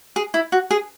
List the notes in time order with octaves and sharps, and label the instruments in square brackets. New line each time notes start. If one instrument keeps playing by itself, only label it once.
[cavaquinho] G#4
E4
F#4
G#4